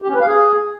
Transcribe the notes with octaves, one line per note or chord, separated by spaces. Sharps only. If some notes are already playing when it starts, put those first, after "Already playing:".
G4
C#4
B4
F5
G#4